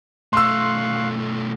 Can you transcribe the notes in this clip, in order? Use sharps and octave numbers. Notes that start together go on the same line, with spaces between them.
B1 A3 F5 C6 C#6 E6 F#6